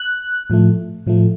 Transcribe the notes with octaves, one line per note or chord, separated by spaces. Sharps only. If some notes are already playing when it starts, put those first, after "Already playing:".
Already playing: F#6
A2 F3 A3
A2 F3 A3